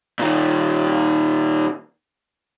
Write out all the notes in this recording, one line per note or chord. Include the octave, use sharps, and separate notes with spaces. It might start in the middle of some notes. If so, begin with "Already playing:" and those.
A#2 D#3